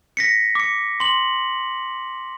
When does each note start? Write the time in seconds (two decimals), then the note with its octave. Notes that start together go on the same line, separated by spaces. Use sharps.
0.17 A#6 B6 C#7
0.55 D6 C#7
1.00 C6 F#7